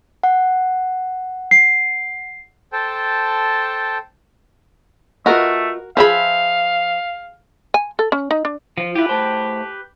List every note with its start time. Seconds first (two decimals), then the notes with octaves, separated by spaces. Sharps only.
0.23 F#5
1.51 C7
2.73 A4 C5 G5 A5
5.26 A3 F4 F#4 A#4 B4 D#5
5.97 F3 G#4 B4 E5 F5 B5
7.74 G#5
7.99 A4
8.12 C#4
8.31 D#4
8.45 D4
8.78 F3 F4
8.95 E4 F4 G4 B4
9.09 A2 C5 A5